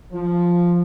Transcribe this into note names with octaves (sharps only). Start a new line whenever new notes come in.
F3